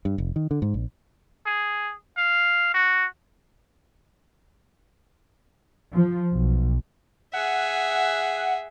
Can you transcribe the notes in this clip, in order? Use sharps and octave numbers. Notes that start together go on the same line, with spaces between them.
G2
F1
D#3
D3
G#2
A#1
G#4
F5
F#4
F3
B1
G#4 E5 F#5